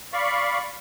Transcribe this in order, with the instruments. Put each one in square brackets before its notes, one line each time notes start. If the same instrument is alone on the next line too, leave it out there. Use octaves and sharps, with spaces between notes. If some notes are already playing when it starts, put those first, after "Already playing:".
[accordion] D5 F5 B5 C#6